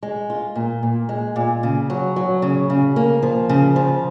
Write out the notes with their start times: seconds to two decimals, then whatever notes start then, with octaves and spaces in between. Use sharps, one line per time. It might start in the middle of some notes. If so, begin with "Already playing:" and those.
0.03 G#3
0.30 F4
0.55 A#2
0.83 A#2
1.09 G#3
1.36 A#2
1.63 C#3
1.90 F#3
2.16 F#3
2.42 C#3
2.70 C#3
2.96 A#3
3.22 F3
3.49 C#3
3.76 F3